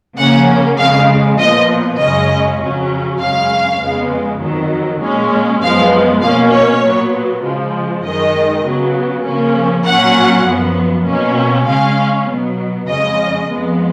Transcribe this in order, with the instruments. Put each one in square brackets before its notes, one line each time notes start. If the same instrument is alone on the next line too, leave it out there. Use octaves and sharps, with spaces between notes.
[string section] C#3 F3 A#3 C#4 F#5
F2 C#3 G#3 F5
A#2 F3 B3 D#5
F#2 C#3 G#3 C#4 D#5
F2 C#3 F#3 C#4
F#2 C#3 G#3 C#4 F5
F2 C#3 G#3 B3
F2 D#3 F#3
A#2 G#3 C#4
F#2 F3 G#3 B3 F5
B2 A#3 C#4 F5
C#5
A#2 F#3 B3
C#3 F3 G#3
F#2 D#3 G#3 D#5
C#3 F#3 B3
C#3 F3 A#3 C#4
A#2 F#3 C#4 F#5
F#2 F3 B3
B2 A#3 C#4
C#3 G#3 C#4 F5
B2 F#3 B3
F2 C#3 G#3 C#4 D#5
F2 F3 G#3 B3